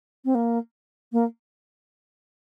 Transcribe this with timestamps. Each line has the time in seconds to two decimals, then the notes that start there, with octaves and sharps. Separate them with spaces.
0.25 C4
0.35 A#3
1.12 A#3